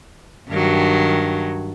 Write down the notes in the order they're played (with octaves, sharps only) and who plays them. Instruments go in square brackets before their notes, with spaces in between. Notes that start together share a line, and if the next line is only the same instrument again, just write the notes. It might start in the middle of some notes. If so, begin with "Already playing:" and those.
[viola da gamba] G2 D#3 F#3